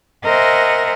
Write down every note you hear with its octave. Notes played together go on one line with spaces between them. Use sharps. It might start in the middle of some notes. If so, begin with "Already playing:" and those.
A#4 C5 D#5 E5 F#5 G#5